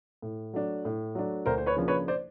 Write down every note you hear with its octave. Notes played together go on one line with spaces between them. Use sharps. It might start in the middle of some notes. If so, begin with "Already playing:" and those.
A2
F#3 A3 D4
A2
F#3 A3 D4
D2 A#4 C5
C5
B4 C#5
C#3 F3 A#3 D4
B4 C#5
C5 D5